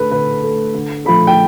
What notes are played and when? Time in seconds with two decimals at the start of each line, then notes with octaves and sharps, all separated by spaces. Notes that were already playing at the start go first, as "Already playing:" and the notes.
Already playing: D3 A3 A4 B4
0.11 D3 B4
0.44 A3
0.74 D3
1.05 F3 A3 B5
1.27 G5